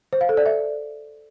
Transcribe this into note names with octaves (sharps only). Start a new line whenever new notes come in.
C5
F5
A4
D5
E5